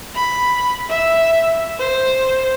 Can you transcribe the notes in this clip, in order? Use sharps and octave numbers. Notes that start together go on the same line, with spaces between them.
B5
E5
C5